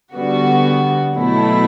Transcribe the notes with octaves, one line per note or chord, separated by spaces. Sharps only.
D3 G3 B3 F#4
B2 F#3 A3 E4